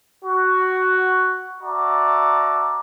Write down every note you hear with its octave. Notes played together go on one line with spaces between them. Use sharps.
F#4
F#4 D5 E5 A5 A#5